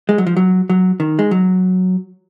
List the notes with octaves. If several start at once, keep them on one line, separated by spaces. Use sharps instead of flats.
G#3
F#3
F3
F#3
F#3
D#3
G#3
F#3